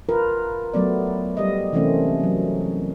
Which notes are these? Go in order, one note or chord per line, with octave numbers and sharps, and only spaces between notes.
F4 A#4 B4
F#3 A3 B3 D5
G3 D#5
C3 E3 A3 A#3 C4 C#4
F#3